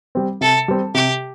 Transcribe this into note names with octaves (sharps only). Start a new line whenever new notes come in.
G3 C4
C3 A4
G3 C4
C3 G4